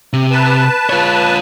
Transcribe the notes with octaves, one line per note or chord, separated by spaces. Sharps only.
C3
B4 A5
F4 C#5